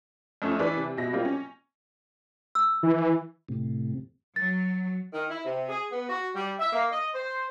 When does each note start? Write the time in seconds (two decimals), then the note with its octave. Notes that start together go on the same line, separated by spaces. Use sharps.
0.42 F2 A3 C#4
0.59 E3 D4 E4 B4
0.77 C3
0.97 B2 E5 A#6
1.13 G3 A#3 C4 F4
1.25 C#4
2.55 E6
2.83 E3
3.49 A2 C3
4.36 F#3 A6
5.12 D#3
5.29 E4
5.45 C3
5.69 G#4
5.91 B3
6.09 F#4
6.35 G3
6.59 E5
6.72 A#3
6.91 D#5
7.13 C5